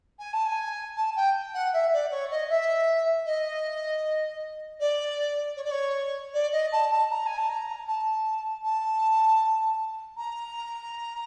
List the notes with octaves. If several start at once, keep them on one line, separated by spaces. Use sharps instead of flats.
G#5
A5
G#5
A5
G5
F#5
E5
D5
C#5
D#5
E5
D#5
D5
C#5
D5
C#5
D5
D#5
A5
A5
A#5
G#5
A5
A#5
A5
A5
A#5